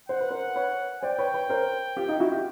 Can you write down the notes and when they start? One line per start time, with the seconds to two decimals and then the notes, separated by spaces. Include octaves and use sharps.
0.09 C5 F#5
0.20 B4
0.30 A#4 C5
0.56 B4 C#5
1.02 C5 D5 G5
1.18 B4 C#5
1.34 B4 C#5
1.49 A#4 C5
1.97 F4 G4
2.08 D#4 F4
2.20 E4 F#4
2.32 F4 G4